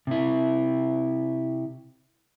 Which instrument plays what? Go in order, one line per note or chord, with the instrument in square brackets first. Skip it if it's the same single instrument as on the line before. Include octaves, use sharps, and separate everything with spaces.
[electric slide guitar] C3 E4